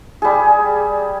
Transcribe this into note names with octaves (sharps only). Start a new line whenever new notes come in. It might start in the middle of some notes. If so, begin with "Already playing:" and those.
G3 G#4